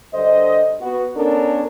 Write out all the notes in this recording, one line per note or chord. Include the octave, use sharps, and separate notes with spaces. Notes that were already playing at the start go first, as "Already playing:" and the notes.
G2 D3 C5 D#5
B3 F#4
B3 C#4 D4 A4 A#4